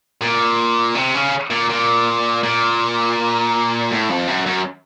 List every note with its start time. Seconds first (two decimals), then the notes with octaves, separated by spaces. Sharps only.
0.21 A#2
0.95 C3
1.15 C#3
1.51 A#2
1.70 A#2
2.43 A#2
3.91 A2
4.10 F2
4.28 F#2
4.46 F#2